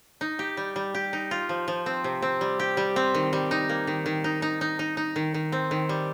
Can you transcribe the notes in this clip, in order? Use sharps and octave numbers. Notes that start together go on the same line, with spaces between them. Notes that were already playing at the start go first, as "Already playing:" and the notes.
D#4
G4
G3
G3
G4
D#4
F4
F3
F3
C4
C3
C4
G3
G4
G3
C4
D#3
G3
D#4
A#3
D#3
D#3
D#4
D#4
D#4
D#4
D#4
D#3
D#3
C4
D#3
G3